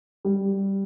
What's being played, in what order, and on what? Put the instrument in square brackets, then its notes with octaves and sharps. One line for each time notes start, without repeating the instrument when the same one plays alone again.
[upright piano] G3